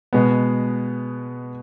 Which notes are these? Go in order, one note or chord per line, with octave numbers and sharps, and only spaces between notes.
B2 G#3 B3